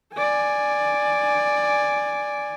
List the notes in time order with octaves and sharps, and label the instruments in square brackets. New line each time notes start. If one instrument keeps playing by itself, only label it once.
[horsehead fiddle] D5 G#5